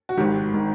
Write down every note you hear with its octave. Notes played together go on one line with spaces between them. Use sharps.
F#4
G#1 G#2 D#3 G4
D#3